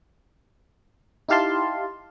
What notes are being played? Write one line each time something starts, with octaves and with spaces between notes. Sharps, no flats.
D#4 E4 G4 F5 A5 C6